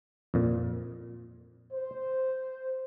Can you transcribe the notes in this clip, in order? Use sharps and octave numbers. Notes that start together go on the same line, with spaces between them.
F2 A#2
C5